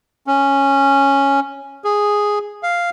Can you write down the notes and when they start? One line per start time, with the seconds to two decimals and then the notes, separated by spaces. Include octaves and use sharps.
0.27 C#4
1.84 G#4
2.63 F5